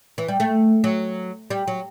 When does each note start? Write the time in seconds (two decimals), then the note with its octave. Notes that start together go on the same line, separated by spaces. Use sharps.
0.18 E3
0.28 G3
0.40 A3
0.84 F#3
1.50 G3
1.68 F#3